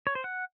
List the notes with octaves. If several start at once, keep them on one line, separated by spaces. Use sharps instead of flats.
C#5
C5
F#5